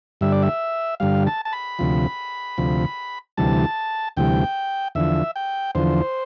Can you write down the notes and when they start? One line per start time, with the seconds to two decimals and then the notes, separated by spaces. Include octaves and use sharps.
0.21 G2 D3 G3 E5
0.32 D5
0.43 E5
1.00 G2 D3 G3 F5
1.27 A5
1.45 A5
1.53 B5
1.79 D2 C3 F3
2.58 D2 C3 F3
3.37 D2 C3 E3 G3 A5
4.17 D2 C3 E3 G3 G5
4.95 E2 D3 F3 E5
5.36 G5
5.75 E2 D3 F3 C5